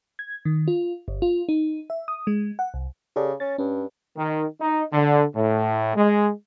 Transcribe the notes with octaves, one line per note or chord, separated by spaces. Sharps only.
G#6
D#3
F4
G1
F4
D#4
E5
D#6
G#3
F#5
C2
C#3 G4 A4 D5
C#4 A6
G2 C#4
D#3
D#4
D3
A2
G#3